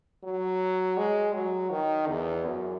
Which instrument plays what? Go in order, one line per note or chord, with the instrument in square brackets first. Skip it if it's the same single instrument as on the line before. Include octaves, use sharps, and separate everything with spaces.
[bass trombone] F#3
G#3
F#3
D#3
E2
F#2